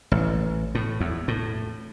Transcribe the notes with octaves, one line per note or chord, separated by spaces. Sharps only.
A1
A2
E2
A2